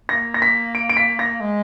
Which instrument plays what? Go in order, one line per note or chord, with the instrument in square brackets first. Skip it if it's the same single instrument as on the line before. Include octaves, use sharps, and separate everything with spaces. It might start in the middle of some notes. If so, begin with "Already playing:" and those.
[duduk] A#3 [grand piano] A#6
[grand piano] A#6
B6
D7
D7
B6
A#6
[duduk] G#3